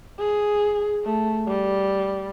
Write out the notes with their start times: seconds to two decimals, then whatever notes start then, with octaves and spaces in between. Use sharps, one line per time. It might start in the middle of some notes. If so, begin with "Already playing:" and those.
0.19 G#4
1.05 A3
1.48 G3